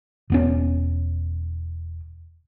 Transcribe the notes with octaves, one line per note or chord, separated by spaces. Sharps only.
E1 B3 C#4